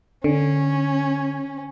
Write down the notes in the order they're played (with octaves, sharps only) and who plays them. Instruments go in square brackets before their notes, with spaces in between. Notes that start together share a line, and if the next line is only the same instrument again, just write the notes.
[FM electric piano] D3 [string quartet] C#4